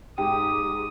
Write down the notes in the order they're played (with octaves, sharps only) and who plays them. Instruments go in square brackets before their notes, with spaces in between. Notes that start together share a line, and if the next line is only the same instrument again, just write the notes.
[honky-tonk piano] G#2 G#3 [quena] G4 [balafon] G5 [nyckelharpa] D#6